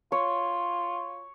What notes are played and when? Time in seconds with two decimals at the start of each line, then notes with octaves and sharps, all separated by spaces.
0.12 F4 C#5